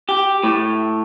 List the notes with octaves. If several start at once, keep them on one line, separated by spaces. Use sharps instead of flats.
G4
A2